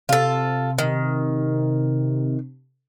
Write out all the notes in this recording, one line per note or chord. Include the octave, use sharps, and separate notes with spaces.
C3 F4 A4
D#3